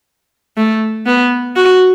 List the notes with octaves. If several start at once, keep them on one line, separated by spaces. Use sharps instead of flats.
A3
B3
F#4